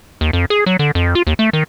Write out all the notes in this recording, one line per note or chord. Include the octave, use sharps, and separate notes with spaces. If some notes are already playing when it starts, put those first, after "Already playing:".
D#2
F2
G#4
F#3
D3
F2
F4
D#2
A3
D#3